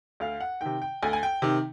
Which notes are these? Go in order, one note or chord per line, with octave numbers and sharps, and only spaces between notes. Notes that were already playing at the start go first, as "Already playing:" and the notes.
D2 F5
F#5
C3 D#3 G5
G5
D2 G#5
G#5
G5
C3 D#3